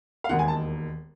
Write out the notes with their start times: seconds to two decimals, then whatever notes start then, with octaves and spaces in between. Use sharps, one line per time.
0.24 F5
0.29 E1 D#2 D#3 F#5
0.39 G#5
0.48 A5